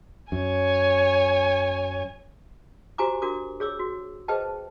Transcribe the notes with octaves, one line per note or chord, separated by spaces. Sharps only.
F#2 C#5 G#5
F#4 G4 C5 G#5 A#5 D6
D4 F#4 A#4 D6
G#4 C#5 D6 E6
F#4
G#4 B4 C5 D#5 G5 A5